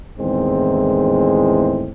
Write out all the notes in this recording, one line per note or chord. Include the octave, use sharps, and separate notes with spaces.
E2 A2 D#3 G#3 C4